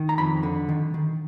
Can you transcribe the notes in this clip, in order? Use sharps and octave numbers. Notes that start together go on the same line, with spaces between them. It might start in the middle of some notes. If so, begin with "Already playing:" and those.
Already playing: D#3
A#5
F2 B5
D3
D#3
D#3